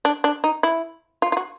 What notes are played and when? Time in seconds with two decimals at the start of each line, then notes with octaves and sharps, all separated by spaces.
0.05 D4
0.24 D4
0.44 D#4
0.63 E4
1.22 F4
1.32 F4
1.37 F#4